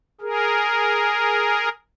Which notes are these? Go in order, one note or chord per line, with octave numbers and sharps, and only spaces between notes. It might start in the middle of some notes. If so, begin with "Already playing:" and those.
G#4 A#4